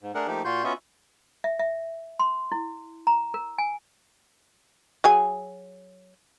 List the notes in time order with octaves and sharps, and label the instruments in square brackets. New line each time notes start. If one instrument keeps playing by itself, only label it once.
[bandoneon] G#2
A3 D4 G#4 A#4 F#5
F3 A3 A#3 D#4 G4
A#2 F4 F#4 C6 G6
B3 C#4 F4 F#4 D#5 E5
[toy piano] E5
E5
C6
E4
A#5
A#4
G#5
[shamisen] F#3 G#4 G#5